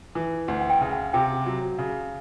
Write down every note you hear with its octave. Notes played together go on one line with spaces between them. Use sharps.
E3
D2
F#5
G5
C#3
F#5
C3 G5
F#3
C#3